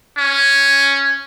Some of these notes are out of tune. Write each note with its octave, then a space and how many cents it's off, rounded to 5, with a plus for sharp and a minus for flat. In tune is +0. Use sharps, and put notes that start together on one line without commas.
C#4 +0